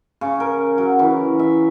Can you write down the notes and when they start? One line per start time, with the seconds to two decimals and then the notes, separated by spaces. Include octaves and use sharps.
0.21 C#3
0.40 A#4
0.78 F#3
0.99 E3
1.39 E5